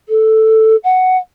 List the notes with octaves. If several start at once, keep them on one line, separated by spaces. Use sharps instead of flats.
A4
F#5